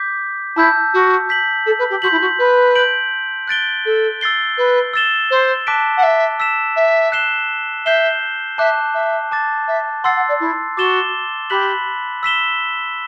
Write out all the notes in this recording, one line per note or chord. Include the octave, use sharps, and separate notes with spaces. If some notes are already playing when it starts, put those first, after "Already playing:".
Already playing: D6 G6 B6
E4 A5 E6 G6
F#4
G6 B6 F#7
A4
B4
G4
F#4 C6 G6 B6 F#7
E4
F#4
B4
G6 D7 F#7
F#6 A6 D7 G7
A4
E6 A6 C7 G7
B4
E6 A6 E7 G7
C5
A5 D6 F#6 B6 D7
F#5
E5
E6 B6 E7
E5
F#6 C7 E7 G7
E5 G6 C7 E7 G7
E5 A5 D6 F#6
E5
A5 D6 A6
E5
F#5 C6 E6 A6 C7
F#5
D5
E4
F#4 D6 A6 E7 G7
G4 B5 F#6 B6 F#7
E6 B6 E7 G7